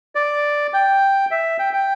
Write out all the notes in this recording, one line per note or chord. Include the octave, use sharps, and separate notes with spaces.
D5
G5
E5
G5
G5